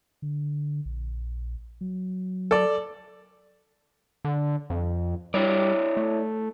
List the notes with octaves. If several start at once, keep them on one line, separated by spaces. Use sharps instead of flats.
D3
A#1
F#3
A4 D5
D3
F2
G3 E4 C#5 D5
A3